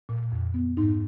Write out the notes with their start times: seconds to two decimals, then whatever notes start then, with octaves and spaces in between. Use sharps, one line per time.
0.09 A#2
0.32 F2
0.54 B3
0.77 G#2 D#4